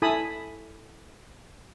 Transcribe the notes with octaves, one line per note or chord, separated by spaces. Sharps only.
E4 A4 G#5 A5 B5 D#6